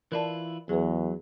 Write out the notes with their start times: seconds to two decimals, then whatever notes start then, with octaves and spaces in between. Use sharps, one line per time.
0.12 E3 E4 F4 A#4 D5 A5
0.69 E2 F#3 G#4 B4